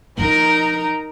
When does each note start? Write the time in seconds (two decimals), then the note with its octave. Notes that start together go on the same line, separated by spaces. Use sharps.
0.18 F3 D#4 F4 A#4 A#5